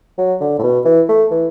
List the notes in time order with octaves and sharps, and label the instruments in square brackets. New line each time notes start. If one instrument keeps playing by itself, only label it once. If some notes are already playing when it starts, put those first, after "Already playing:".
[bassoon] F#3
D3
A2
B2
E3
A3
E3